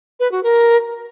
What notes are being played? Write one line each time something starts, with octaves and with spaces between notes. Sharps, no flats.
B4
F#4
A#4